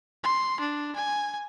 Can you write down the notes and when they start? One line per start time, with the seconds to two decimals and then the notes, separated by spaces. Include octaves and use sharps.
0.23 C6
0.60 D4
0.96 G#5